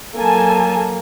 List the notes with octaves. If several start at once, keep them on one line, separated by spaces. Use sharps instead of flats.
F#3 A#3 A4 G#5 A5